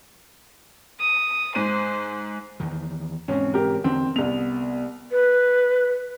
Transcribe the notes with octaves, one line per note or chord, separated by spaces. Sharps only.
D#6
G#2 C5 D#7
E2 D#3
E1 G#2 C4 C#4
G4 A#4
E2 D3 C4
C2 B3 F7
B4